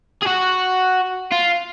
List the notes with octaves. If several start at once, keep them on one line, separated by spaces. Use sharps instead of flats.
G#4
F#4
F4